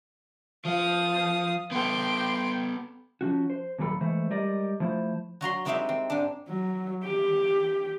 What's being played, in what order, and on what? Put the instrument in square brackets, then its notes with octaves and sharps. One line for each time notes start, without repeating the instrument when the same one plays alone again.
[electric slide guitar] F3 [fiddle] F5 D#6
[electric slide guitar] B3 A4 [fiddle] G5 C6
[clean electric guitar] F3 C#4 F#4
C5
D#2 A#2 F#3 G#4 A4 B5
E3 G#3 A3 C5
G3 G#3 G4 A#4 D5 D#5
F3 A3 E4 C5
[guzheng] F#3 F#4 A#5 C6
G#3 C4 D#4 E4 G4 E5
C4
G#2 D4
[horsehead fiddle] F#3
G4